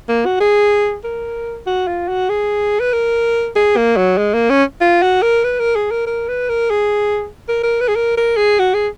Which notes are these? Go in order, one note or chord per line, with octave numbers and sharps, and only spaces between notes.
A#3
F#4
G#4
A#4
F#4
F4
F#4
G#4
B4
A#4
G#4
A#3
F#3
G#3
A#3
C#4
F4
F#4
A#4
B4
A#4
G#4
A#4
A#4
B4
A#4
G#4
A#4
A#4
B4
G#4
A#4
A#4
G#4
F#4
G#4